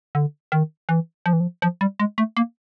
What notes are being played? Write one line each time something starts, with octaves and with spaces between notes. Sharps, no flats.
D3
D#3
E3
F3
E3
F3
F3
G3
G#3
A3
A#3